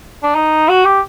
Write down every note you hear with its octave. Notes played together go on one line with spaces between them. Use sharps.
D4
D#4
F#4
G4